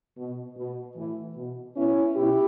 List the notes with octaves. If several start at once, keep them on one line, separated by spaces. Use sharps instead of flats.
B2
B2
A2 E3
B2
B2 C#4 E4
B2 E4 G4